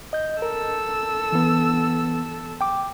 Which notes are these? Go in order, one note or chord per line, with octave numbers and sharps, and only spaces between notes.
D#5 G6
A4 A#4 E6
E3 B3
G5 D6